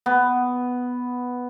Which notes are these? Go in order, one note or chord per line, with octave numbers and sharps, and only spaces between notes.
B3